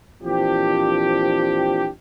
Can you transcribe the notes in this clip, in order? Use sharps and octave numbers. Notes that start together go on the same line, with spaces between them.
A#2 E3 F3 C4 D4 G4